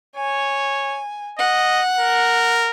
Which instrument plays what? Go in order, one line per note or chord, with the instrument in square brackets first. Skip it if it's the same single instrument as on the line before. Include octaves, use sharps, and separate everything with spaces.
[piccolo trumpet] C#5 [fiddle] G#5
[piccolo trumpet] D#5 [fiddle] F#5
[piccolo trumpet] A#4